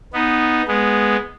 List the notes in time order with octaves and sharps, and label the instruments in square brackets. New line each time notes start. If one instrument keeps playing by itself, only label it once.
[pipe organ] B3 D#4
G#3 B3